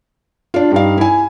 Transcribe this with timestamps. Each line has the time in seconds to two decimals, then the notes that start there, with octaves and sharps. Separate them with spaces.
0.54 D4 F4
0.72 G2 D#4 F5
0.97 E4 G#5